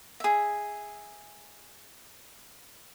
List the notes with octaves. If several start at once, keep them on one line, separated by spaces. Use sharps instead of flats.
G#4 E5